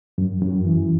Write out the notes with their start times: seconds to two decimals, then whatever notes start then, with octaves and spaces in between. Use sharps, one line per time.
0.18 F#2
0.42 F#2
0.65 E3